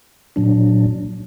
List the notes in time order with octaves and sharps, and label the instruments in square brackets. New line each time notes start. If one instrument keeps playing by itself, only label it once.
[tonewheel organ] A#2 F#3 D4